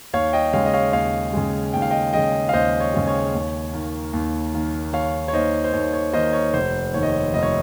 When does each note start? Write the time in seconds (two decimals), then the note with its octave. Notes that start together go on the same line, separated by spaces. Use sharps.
0.13 D#2 C#5 F5
0.33 D#5 G5
0.53 C#3 G#3 C#5 F5
0.66 D#5
0.74 C#5 F5
0.93 D#2 C#5 F5
1.33 C#3 G#3
1.73 D#2 G5
1.82 F5
1.90 D#5 G5
2.13 C#3 G#3 D#5 G5
2.49 F5
2.54 D#2 C5 D#5
2.80 C#5
2.94 C#3 G#3
3.07 C#5
3.33 D#2
3.73 D#3 A#3
4.13 D#2
4.54 D#3 A#3
4.93 D#2 C#5 F5
5.28 C#5
5.33 D#3 A#3 C5 D#5
5.64 C5
5.73 D#2 C#5
5.93 C#5
6.13 D#3 A#3 C5 D#5
6.33 C#5
6.54 F1 C5
6.94 D#2 D#3 C#5
7.03 D#5
7.13 C#5
7.34 F1 D#5
7.43 C#5